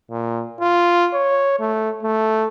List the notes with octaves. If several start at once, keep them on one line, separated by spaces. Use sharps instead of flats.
A#2
F4
C#5
A3
A3